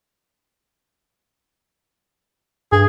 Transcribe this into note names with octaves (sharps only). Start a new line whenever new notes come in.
G2 G#4